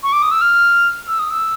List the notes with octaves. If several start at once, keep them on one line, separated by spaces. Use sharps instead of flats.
C#6
D6
D#6
E6
F6
E6
D#6
E6